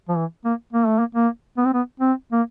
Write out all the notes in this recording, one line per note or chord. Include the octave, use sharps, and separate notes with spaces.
F3
E3
A#3
A#3
A3
A#3
A#3
B3
C4
B3
C4
A#3